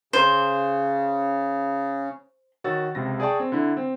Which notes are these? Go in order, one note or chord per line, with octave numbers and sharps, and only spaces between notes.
C#3 C5
D#3 F#4 C#5 E6 A6
C#2 C3 A#6
G#4 D5 G5 A5 C#6
C4
D3 E4
C4